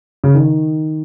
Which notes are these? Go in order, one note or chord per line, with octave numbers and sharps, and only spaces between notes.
C#3
D#3